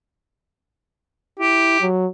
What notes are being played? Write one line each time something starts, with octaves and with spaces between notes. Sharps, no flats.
E4 G4
F#3